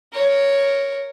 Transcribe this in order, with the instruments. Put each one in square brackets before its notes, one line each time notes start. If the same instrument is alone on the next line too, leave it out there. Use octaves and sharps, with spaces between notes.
[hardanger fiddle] A#4 C#5